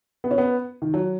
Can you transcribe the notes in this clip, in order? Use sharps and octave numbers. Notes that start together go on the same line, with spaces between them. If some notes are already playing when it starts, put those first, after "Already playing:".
B3
C#4
B3
D#3
F#3